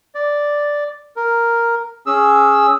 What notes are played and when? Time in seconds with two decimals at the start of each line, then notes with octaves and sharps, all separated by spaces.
0.15 D5
1.16 A#4
2.06 C#4 G#4 E6